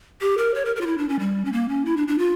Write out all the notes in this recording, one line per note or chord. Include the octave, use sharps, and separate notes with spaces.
G4
A#4
C#5
A#4
A#4
F4
E4
D4
C#4
G3
C#4
A#3
C#4
E4
D4
D4
F4